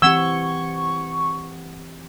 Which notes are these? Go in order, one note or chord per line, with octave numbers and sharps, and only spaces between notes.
E3 C4 G4 F#5 C#6 E6 G#6 G7